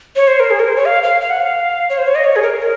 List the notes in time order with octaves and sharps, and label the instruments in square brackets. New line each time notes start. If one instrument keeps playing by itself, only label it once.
[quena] C#5
C5
A#4
G#4
A#4
C5
C#5
F5
F5
F5
F#5
F5
C#5
C5
C#5
D#5
C#5
G#4
A#4
A#4